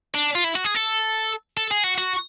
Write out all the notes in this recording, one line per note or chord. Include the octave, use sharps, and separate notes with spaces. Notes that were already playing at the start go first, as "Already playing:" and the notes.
D4
F4
E4
F#4
G#4
A4
A4
G#4
F#4
F#4